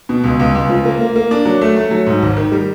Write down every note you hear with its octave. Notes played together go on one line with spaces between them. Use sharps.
B2
C#2
C#2
C#2
F3
A#3
A#3
A#3
D4
F#3
A3
A3
F#3
G#2
G#1
D#3
G3